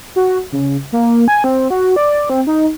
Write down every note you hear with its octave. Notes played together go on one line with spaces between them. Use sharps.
F#4
C#3
A#3
G#5
C4
F#4
D5
C4
D#4